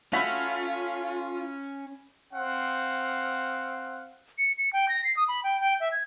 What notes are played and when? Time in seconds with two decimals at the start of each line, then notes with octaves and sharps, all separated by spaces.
0.13 A3 C#4 F4 F#4 B5
2.34 C4 F5 F#5
4.38 C#7
4.58 C#7
4.73 G5
4.89 A#6
5.04 C7
5.16 D#6
5.28 B5
5.44 G5
5.60 G5
5.80 E5
5.92 G#6